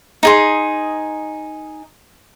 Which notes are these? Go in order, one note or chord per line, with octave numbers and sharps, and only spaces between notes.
D#4 G#4 C6